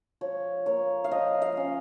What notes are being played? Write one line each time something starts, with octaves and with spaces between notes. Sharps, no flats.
F3 C#5
A#3 C#5
F5
F3 D#5
F5
C#4